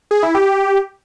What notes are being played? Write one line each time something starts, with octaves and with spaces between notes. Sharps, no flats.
G#4
E4
G4